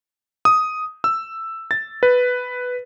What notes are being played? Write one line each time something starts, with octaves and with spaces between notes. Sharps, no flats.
D#6
E6
A6
B4